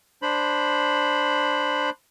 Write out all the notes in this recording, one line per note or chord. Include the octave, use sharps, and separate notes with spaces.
D4 C5 B5